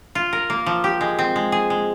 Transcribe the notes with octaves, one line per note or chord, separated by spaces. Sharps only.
F4
A#4
A#3
F3
G4
G#3
C4
G#3
G#4
G#3